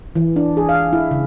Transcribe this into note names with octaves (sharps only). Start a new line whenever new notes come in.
E3
D4
G#4
F5
E4
C#3